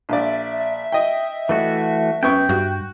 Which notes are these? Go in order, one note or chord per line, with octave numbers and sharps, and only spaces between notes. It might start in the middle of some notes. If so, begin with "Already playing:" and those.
A#1 D5 E5
D#5 G5
E3 A3 F#4
F#2 B3 G5 C#6
G2 F#4